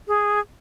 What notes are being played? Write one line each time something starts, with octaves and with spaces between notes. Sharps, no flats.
G#4